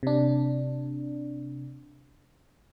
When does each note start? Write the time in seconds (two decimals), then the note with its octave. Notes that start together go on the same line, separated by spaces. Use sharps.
0.03 C3 D4